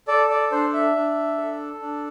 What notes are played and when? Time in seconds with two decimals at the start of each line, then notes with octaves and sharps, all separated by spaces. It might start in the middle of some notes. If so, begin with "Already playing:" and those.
0.08 A4 D5
0.30 D5
0.51 D4 C5
0.74 E5
0.95 D4
1.38 A4
1.81 D4